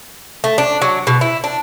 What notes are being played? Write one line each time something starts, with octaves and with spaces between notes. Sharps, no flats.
A3
D4
F#3
B2
E4
D4